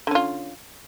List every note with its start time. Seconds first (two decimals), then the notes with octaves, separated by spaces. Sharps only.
0.07 D3
0.11 C#4
0.15 F4